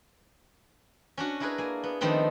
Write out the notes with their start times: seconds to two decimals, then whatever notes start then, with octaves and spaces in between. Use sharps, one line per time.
1.18 C#4 D4 F#4
1.40 D4 E4 G#4 A#4 B4
1.58 A#3 G#5
1.84 B3
2.01 D#3 F3 A3 B3 C4 D4